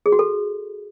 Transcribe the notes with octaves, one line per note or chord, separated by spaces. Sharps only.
G#4
F#4
A4